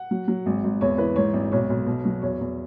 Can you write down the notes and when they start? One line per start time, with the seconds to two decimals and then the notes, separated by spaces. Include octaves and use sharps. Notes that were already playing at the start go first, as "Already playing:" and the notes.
Already playing: F#5
0.11 F#3
0.28 F#3
0.46 G#1
0.64 G#1
0.81 E2 C#5
0.98 E3 B4
1.16 G#2 C#5
1.34 G#1
1.52 B1 C#5
1.70 B1
1.86 B2
2.05 F#3
2.22 E2 C#5
2.41 E2